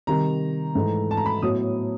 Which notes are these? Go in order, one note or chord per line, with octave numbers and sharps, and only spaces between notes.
C3 D#3 G3 A#5
G#2 E3 A3
A5
A#5
B5
A2 F#3 B3 D#6